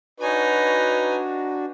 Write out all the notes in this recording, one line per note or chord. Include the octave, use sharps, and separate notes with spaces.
D4 D#4 F#4 B4 C#5 G#5